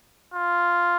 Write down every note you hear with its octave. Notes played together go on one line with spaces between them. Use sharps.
F4